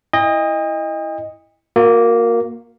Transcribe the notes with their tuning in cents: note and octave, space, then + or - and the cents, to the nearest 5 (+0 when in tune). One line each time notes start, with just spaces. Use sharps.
E4 +0 D#5 +0 G5 +45
A#3 +0 F#4 -35